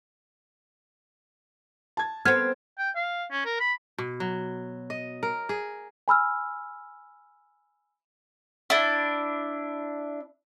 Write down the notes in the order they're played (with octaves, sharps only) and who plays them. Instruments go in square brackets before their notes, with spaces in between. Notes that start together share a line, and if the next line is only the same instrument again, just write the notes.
[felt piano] A5 G#6
[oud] B3 C4 [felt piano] A4 C5 [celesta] F6 G#6
[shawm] G5
F5
C#4
A#4
B5
[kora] B2
F#3
D#5
A#4
G#4
[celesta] G#5 B5 E6 F6
[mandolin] D4 E4